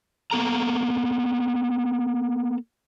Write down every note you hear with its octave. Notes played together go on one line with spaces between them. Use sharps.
A#3 B3 A4 A#5